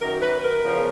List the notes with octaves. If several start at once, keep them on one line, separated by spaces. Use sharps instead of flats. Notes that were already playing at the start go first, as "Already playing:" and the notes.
F#2 D#3 A#4
B4
A#4
E2 C#3 F3